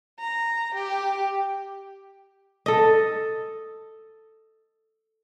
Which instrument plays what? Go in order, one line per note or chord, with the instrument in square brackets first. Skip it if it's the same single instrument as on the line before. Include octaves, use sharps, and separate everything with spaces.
[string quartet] A#5
G4
[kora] A4 D#5